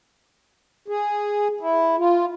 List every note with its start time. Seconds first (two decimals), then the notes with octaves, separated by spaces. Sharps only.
0.88 G#4
1.61 E4
1.98 F4